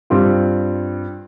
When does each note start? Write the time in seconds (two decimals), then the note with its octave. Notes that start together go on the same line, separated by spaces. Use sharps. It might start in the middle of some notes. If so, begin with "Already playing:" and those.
0.10 G2 G3 C4 F4